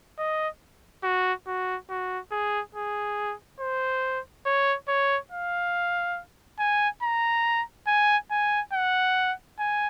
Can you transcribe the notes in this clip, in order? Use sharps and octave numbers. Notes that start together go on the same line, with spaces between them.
D#5
F#4
F#4
F#4
G#4
G#4
C5
C#5
C#5
F5
G#5
A#5
G#5
G#5
F#5
G#5